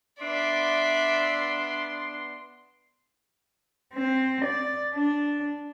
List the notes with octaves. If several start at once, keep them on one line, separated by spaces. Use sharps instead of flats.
B3 D4 D5 E5 C6
C4
D5
D4